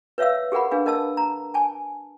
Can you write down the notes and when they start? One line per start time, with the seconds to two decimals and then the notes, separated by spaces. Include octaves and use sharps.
0.18 B4 C#5 E5 F5 E6
0.52 G4 G#4 A#4 F#5 B5
0.71 D4 G#4 B4 F5
0.86 A#4 D#5 A5 E6
1.17 A#5
1.54 G#5 A5